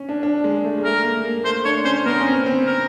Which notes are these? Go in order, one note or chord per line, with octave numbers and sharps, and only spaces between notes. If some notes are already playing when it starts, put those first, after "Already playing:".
Already playing: C#4
D4
D4
G#3
A3
G#3
A3 A#4
A#3
A#3
A3 C5
D4 C#5
C#4 C5
B3 A#4
C#4
C4
C4
A#4